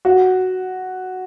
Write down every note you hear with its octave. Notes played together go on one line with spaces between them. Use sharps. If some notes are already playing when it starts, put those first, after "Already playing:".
F#4